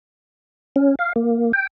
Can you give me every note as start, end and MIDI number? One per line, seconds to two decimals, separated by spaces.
0.76 0.95 61
0.99 1.13 77
1.16 1.52 58
1.53 1.67 79